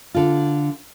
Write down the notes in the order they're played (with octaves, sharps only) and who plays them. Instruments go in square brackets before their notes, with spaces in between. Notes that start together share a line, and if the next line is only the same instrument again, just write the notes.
[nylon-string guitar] D3 F4